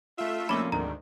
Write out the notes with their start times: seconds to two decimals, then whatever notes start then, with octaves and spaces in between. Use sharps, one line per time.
0.18 A3 F4 E5
0.49 F2 A#2 A#3 C#4 B5 D6
0.72 D2 G#2 D#3 D4 A#5